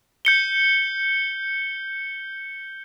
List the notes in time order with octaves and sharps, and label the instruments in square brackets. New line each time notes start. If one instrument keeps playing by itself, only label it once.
[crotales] G6 C#7 G7